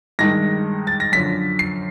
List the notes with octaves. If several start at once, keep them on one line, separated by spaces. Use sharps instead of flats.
G2 D#3 G#3 A#6
A6
A#6
F#2 D3 F3 B6
C7